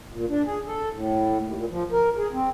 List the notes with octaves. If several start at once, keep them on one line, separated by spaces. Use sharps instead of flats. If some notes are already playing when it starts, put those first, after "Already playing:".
A#2
D4
G#4
A4
A2
D#2
A#2
F3
A#4
G#4
C4